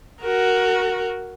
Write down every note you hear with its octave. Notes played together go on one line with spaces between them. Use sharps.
F#4 A#4